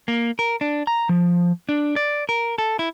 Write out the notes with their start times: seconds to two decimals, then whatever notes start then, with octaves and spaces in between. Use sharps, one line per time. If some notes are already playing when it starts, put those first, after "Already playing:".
0.08 A#3
0.39 A#4
0.61 D4
0.87 A#5
1.09 F3
1.69 D4
1.96 D5
2.29 A#4
2.58 A4
2.79 E4